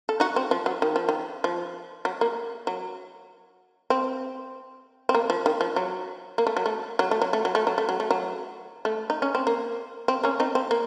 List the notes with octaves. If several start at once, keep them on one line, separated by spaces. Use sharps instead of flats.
A4
D#4 F#4
C4
F3
F#3
D#3
F3
D#3
F3
F#3
A#3
F#3
C4
C4
A#3
F3
D#3
F3
F#3
A#3
A3
F#3
A3
F#3
A3
F#3
A3
F#3
A3
F#3
A3
F#3
A3
F#3
A3
D#4
C#4
C4
A#3
C4
A#3 C#4
C4 D#4
C4
A#3